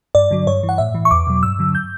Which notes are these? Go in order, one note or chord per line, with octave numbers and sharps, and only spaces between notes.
G2 D5
D3 F#3
G2 C#5
E3
F#5
A2 E5
E3
C#6
E2 D6
B2 F#3
G2 E6
D3 F#3
G6